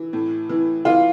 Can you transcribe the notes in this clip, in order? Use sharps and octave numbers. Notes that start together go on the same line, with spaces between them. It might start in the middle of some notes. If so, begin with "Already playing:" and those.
Already playing: E3
A2
E3
E3 F4